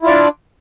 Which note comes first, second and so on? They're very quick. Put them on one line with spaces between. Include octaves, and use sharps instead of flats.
E4 F4 D5 D4